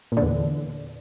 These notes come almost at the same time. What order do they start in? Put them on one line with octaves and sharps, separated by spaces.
A#2 D3 E2